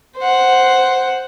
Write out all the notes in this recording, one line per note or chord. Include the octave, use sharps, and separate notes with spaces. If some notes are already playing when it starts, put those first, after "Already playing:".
C5 F#5